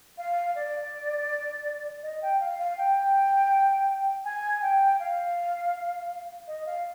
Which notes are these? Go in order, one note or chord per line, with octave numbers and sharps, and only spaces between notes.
F5
D5
D#5
G5
F5
F5
G5
G#5
G5
F5
D#5
F5